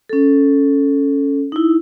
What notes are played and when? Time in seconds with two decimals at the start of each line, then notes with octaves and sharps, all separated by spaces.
0.09 C#4 A4
1.52 D#4 E4